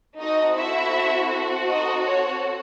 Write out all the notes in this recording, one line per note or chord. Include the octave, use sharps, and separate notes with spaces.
C4 D#4 F#4 A4 D#5
E4 E5
D#4 D#5
C#5